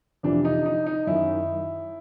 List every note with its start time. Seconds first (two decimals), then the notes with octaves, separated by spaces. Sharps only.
0.23 F2 C3 E3 D4
0.45 D#4
0.66 D#4
0.86 D#4
1.07 F#2 D#3 E4